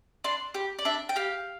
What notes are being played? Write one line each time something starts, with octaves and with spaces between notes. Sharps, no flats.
D4 C6
G4
D5
D4 E5
G5
G4 F5